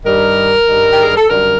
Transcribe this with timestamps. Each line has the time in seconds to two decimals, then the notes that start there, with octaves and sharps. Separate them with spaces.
0.05 G2 D#3 G3 A#4
0.67 G2 D#3 G3
0.90 G4
1.03 G#4
1.16 A4
1.29 F#2 D3 G3 A#4